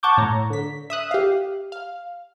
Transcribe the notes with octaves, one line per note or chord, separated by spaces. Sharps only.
F#5 A5 C#6 D6 G6
A2 C#5 A#5
D3 B6
E5 D#6 F#6
G4 F5
F5